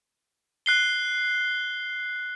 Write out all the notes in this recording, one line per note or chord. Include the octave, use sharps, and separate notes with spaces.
F#6 C7 G7